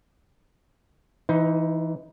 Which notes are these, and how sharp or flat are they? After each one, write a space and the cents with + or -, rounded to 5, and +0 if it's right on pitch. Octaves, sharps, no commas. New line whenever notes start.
E3 +0 D#4 +20 B4 +40